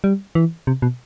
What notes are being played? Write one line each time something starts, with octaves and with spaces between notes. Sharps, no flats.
G3
E3
C3
B2